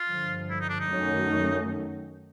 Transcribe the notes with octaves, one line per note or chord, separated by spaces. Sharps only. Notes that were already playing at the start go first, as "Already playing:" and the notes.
Already playing: F4
G2 D3 F3
E4
D#4
D4
D#4
F#2 D#3 F#3 A3 C#4